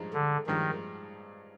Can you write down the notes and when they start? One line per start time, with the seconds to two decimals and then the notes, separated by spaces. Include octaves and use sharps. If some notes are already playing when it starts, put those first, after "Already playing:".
Already playing: G2 F3 G#3 D#4
0.13 D3
0.47 G2 D#3 F3 G#3 D#4